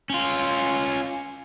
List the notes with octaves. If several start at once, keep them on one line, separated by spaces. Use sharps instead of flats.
C#4 F4